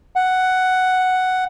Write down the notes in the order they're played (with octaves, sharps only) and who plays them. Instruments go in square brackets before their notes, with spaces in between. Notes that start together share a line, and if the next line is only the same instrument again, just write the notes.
[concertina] F#5